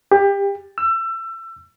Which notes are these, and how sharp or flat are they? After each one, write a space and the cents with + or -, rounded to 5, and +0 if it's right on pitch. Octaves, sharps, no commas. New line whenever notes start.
G4 +25
E6 +25